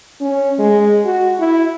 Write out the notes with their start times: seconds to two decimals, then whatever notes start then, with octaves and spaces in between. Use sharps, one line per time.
0.21 C#4
0.59 G#3
1.05 F#4
1.39 E4